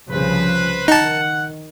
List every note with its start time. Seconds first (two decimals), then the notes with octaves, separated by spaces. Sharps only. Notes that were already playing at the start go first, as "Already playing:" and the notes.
0.10 C2 C#3 F3 B4 C5
0.88 D#3 D#4 F#5 A5